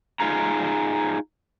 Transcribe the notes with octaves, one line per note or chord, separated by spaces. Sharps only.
D#4 F4 G#4 A#5